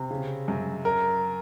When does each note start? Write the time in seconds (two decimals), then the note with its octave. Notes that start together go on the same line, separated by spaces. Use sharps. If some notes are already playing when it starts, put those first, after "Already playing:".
Already playing: C3
0.11 C#3
0.48 F#2
0.85 A#4